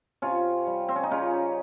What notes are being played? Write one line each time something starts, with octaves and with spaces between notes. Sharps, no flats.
C3 C#4 F4
G3
C4
C#4
D#4
C#3 C#4 F4